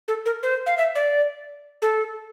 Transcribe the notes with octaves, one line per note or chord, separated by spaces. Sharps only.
A4
A#4
C5
F5
E5
D5
A4